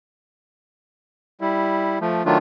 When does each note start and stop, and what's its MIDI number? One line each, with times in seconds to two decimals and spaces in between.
1.41 1.99 55
1.41 1.99 64
2.01 2.23 53
2.01 2.23 57
2.25 2.38 51
2.25 2.38 54
2.25 2.38 57
2.25 2.38 62
2.25 2.38 65